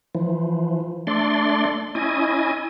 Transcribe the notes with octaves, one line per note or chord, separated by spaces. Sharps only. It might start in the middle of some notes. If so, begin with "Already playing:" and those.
E3 F3
A3 D4 D5 C6
C#4 E4 D#5 G#5